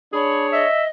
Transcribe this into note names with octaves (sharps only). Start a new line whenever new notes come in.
D4 G#4 C#5 B5
D#5 E5